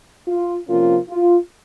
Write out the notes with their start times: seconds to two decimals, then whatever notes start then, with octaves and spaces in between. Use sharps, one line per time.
0.28 F4
0.68 C3 F3 A#3 C#4 F4
1.09 F4